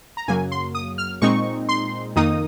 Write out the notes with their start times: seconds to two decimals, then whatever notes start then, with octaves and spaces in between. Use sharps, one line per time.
0.17 A#5
0.28 F#2 C#3 F#3 A#3 G#5
0.52 C6
0.75 D#6
0.98 F6
1.22 A#2 G#3 C4 D#4 C#6
1.69 C6
2.16 F2 D#3 A#3 D#4 D#6